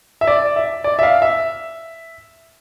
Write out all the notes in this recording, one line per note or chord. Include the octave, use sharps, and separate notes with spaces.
E5
D5
E5
D5
E5
F5
E5